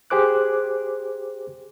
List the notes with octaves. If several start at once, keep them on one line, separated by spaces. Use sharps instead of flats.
G4 G#4 C5 D6 F#6